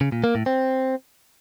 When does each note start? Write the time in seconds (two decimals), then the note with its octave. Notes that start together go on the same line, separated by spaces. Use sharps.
0.01 C#3
0.12 A#2
0.24 A#3
0.35 A2
0.46 C4